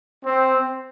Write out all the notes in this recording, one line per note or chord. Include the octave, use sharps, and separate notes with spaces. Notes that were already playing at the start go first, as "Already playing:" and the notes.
C4